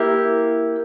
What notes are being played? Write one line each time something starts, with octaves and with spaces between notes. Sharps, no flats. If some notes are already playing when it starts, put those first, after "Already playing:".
Already playing: A#3 E4 G4